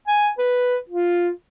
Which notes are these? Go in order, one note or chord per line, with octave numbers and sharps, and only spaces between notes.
G#5
B4
F4